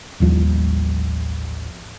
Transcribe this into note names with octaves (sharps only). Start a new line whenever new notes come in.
A1 D#2 F3 G3